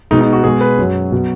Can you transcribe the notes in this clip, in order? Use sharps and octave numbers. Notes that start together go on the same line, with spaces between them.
B2 G#3 D#4
D#4
F#4
B2 G#3 G#4
B4
F#2 F#3
B2 F#3